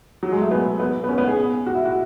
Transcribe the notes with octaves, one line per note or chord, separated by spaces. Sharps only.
F#3
G#3
A3
B3
B3
B3
C#4
B3
G#4
F#4
E4
F#4